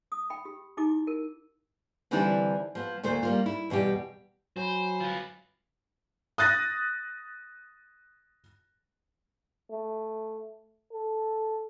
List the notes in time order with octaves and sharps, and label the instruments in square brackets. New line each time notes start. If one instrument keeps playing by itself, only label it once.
[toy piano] D#6
G5 B5
G4
D#4 E4 G4 D6
A#4
[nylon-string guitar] D3 E3 G3 C4 D4 E4
F3 B3
D2 A#2 A3 C5
G3 A#3 F4
E4
E2 B2 G3 G4
[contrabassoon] F#3 [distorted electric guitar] C5 [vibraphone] G#5 B5
[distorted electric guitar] F4 B4
[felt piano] D#6 F#6 A6 A#6
[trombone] A3
A4